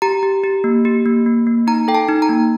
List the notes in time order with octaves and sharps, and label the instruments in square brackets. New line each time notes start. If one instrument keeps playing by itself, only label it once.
[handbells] G4 A#5
G4
G4
A#3
G4
A#3
A#3
A#3
D#4 A#5
A4 G5
A5
D#4
A#5
A#3